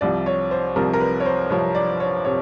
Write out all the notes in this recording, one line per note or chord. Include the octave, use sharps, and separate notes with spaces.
C2 C3 F3 D5
C#5
C5
C2 C3 F3 A#4
A#4
B4
C#5
C5
C2 C3 F3 C#5
D5
C#5
C3 C#5